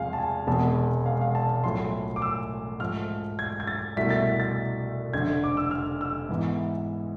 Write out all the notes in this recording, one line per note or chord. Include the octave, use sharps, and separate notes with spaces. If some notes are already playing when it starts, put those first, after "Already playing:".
Already playing: E2 C3 F3 G#3 F5 G#5
A5
G#5
E1 E2 C3 G#3 B3 A5
F5
F5
A5
B1 A2 F3 A3 C6
D6
E6
G#2 F3 A3 F6
G#6
G#6
A6
C2 B2 A3 E4 B6
A6
B6
A6
F1 F2 D3 G#6
D6
E6
F6
E6
G#2 E3 B3 E4